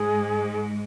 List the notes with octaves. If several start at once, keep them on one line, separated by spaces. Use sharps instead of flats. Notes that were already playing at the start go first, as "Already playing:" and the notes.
Already playing: G#2 G#3 G#4